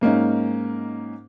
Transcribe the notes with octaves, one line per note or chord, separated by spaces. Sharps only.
G#2 A#3 C#4 D#4